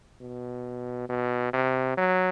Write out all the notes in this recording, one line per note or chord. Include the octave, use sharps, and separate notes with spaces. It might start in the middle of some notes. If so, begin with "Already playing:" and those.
B2
B2
C3
F#3